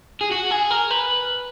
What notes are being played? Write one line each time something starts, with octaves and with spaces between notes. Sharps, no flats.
G#4
F#4
G#4
A#4
B4